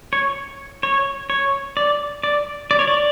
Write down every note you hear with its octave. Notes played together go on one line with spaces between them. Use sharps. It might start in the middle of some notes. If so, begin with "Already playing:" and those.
C#5
C#5
C#5
D5
D5
D5
C#5
D5